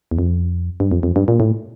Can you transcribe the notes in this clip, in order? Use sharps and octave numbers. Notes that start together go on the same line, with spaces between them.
E2
F2
G2
F2
F2
G2
A#2
A2